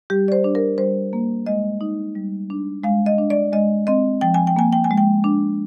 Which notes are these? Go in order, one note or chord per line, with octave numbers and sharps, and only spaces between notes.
G3 G4
D5
C5
D4
A#4
G3 C5
A#3
G#3 D#5
D#4
G3
D4
G#3 F5
D#5
D4
D5
G#3 D#5
C4 D#5
F3 G5
G#5
G5
A#3 G#5
G5
G#5
G#3
G5
D4